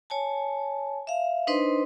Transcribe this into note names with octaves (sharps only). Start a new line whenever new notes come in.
C#5 G#5 A5
E5 F5
D4 D#4 B4 C5 D#5 C6